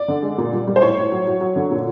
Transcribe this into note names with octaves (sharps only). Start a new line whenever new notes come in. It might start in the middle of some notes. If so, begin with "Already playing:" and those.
Already playing: D5
D3
G#3
A#2
G3
G3
C5
A2 C#5
A2
F#3
F#3
F#3
D3
A#2